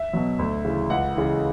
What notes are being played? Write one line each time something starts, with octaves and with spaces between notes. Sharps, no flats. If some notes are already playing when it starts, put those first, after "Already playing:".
Already playing: E5
B2 F#3
D2
C#3 E3
C#2 F#5
C#3 E3